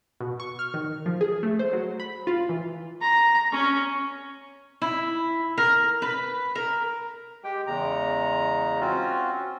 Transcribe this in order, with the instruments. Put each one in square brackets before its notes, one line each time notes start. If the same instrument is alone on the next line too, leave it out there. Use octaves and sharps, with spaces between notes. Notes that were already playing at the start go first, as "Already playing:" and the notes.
[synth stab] B2
C#6
F6
D#3
F3
G#4
A3
C5
F#3
B5
F4
E3
[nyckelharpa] A#5
C#4
[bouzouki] E4
A#4
B4
A#4
[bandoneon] G#3 G4 G5
E2 C#3 G#3 A#5
C4 C#4 F4 F#4